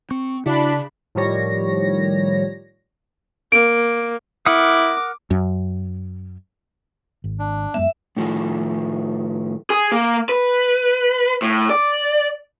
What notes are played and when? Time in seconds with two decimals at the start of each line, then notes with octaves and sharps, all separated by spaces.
0.11 C4 C#6
0.46 C#3 D4 E4 F#4 D5 B5
1.15 A2 D#3 F3 G3 C#5 A#6
3.52 A#3 D7
4.46 E4 A#4 F#5 D6 D#6
5.30 F#2
7.24 G#1
7.39 D4
7.74 F#2 G#3 B3 E5
8.16 A2 D#3 F3 A3 G#4
9.70 G#4
9.92 A#3
10.29 B4
11.42 A2
11.70 D5